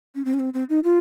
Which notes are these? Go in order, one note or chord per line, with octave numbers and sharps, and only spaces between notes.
C#4
C4
C#4
C4
C4
D#4
F4